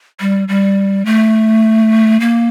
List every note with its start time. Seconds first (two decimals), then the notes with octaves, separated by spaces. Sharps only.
0.20 G3
0.48 G3
1.06 A3
2.20 A#3